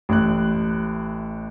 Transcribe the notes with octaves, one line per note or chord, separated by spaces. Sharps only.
A1 A2 F#6